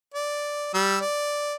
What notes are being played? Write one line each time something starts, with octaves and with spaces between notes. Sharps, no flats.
D5
G3 E6
D5